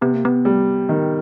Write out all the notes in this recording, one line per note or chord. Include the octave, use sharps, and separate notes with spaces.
C3 B3
A#3
B3
G3
D#3